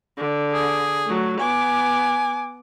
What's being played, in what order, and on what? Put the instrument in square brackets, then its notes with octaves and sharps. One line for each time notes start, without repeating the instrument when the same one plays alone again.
[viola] D3
[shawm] G#4
[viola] F#3 A3
[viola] B3 D6 [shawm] G#5